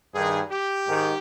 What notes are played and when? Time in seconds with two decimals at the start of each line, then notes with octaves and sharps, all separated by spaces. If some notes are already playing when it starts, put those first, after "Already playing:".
0.15 G2 D#3 G#4
0.50 G4
0.87 G#2 D#3